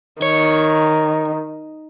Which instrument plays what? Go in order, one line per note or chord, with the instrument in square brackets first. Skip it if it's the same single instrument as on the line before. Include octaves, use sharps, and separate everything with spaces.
[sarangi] D#3 [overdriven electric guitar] C#5